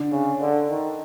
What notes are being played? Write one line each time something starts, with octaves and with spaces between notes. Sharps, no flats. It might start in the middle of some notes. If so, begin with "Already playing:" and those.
Already playing: D3 D4
C#3
D3
D#3